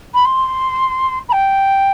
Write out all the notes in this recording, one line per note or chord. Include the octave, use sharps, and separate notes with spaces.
B5
C6
B5
G5